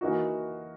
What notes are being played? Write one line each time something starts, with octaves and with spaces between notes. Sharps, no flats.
E3 A#3 D#4 F#4